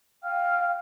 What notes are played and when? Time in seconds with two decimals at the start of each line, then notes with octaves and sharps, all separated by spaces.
0.22 F5 G5 F6